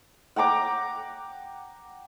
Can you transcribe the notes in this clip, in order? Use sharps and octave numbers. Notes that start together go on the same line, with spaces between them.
F#5 G5 A#5 D6